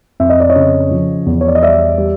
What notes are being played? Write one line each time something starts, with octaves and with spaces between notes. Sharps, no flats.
F2 E5
D#5
D5
C#5 D#5
C#3
F3
E2
C#5
D5
D#5
G3 D5 E5
G3